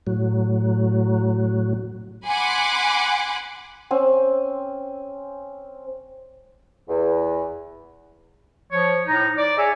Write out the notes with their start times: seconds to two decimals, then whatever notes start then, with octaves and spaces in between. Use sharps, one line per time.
0.07 A2 F#3
2.26 F#5 G#5 B5 C6 D6 F#6
3.91 C4 C#4 G#5
6.89 E2
8.72 F3 C#5
9.07 A2 D#4 A#5
9.38 D5
9.58 G#4 C#5 D5 E5 G#5